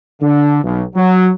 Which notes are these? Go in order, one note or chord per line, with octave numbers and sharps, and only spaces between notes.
D3
B1
F#3